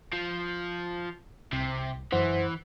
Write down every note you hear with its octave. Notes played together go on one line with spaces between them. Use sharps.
F3
C2 C3
F#2 E3 C5 F#5